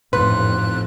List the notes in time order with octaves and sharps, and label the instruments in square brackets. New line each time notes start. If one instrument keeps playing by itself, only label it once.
[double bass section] A1 F2 [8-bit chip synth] G#2 F#6 [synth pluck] B4 [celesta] C6